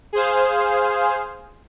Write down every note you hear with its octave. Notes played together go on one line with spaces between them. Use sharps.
G#4 C5 F5